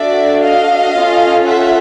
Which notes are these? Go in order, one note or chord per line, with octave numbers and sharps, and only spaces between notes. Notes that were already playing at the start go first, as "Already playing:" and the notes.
Already playing: D4 F#4 A4 D5 E5
D#5 F5
C#4 F4 A4
E5 F#5